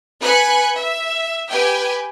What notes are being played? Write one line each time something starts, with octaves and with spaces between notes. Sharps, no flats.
B4 G#5 B5 F#6 C#7
E5
G4 B4 G5 G#5